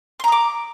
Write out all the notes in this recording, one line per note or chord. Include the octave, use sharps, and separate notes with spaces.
A#5 C6 D6 D#6